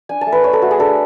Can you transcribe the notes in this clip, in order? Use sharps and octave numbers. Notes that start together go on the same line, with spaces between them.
D4 G#5
A5
A3
B4
D4 C#5
A4
A3 F#4
G#4
D4 A4